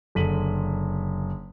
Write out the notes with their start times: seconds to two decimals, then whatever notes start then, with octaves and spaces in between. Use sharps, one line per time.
0.15 F#1 D3 B6 D#7 F#7